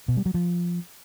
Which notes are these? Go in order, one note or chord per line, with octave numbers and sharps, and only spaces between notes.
B2
G3
F#3
F3